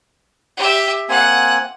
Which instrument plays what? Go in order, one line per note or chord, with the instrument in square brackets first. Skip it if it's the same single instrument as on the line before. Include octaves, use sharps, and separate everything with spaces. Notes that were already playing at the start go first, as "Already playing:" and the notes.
[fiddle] G4 E5
[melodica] A#3 C4 G#5 [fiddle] F#5 F#6